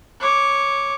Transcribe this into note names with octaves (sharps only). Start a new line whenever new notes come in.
C#5 D6